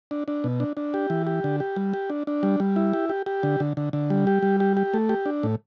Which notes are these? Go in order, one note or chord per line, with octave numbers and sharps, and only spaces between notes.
D4
D4
B2
D4
D4
G4
E3
G4
D3
G4
G3
G4
D4
D4
G3
G3
E4
G4
G4
G4
D3
D3
D3
D3
G3
G4
G3
G4
G4
A3
G4
D4
A2